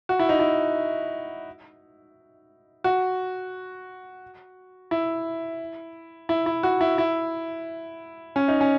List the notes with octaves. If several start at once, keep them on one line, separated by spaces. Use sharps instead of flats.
F#4
E4
D#4
E4
F#4
E4
E4
E4
F#4
E4
E4
C#4
D#4
C#4